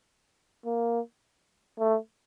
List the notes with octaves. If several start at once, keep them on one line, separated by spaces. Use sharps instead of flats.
A#3
A3